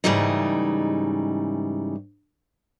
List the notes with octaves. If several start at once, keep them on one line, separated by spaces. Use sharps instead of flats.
G#2 C#3 E3 G3 A3 D#4